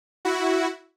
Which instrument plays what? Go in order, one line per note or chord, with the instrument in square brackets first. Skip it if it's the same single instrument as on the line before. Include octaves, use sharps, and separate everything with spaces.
[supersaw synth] E4 F#4